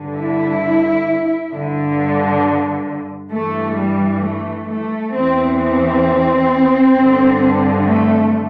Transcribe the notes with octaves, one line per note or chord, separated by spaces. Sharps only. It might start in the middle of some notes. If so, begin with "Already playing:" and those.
Already playing: G2 D3
E4
G2 D3
G2 E3 A3
G3
A3
A3
E2 E3 C4
C4
G2 D3
A3